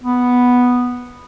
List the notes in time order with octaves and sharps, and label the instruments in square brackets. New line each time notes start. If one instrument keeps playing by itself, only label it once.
[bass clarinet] B3